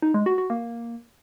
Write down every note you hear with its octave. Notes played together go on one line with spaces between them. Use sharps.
D#4
G#3
F#4
F#4
A#3